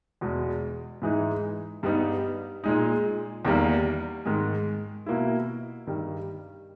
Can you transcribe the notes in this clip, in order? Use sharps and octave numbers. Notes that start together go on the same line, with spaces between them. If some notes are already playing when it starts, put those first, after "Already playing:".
E2 B2 G#3
G#2 E3 G#3 D#4
G2 G3 B3 D#4
A#2 G#3 D#4
E2 D#3 G3 A#3
G#2 D#3 G#3
B2 A#3 E4
G2 D#3 G3